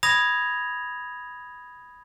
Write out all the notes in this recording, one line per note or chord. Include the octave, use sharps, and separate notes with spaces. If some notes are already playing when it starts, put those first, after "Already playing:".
B5 D#6 G#6 A#6 F7